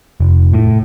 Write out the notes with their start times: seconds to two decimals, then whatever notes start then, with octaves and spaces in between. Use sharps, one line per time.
0.20 F1
0.54 A2